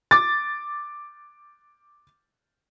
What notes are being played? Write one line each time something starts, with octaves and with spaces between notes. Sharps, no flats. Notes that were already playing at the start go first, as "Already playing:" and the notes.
D6 A6